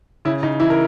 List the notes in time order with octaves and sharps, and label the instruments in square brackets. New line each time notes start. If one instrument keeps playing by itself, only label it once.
[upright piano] C#3 E4
C#3 D#4
E3 E4
A#4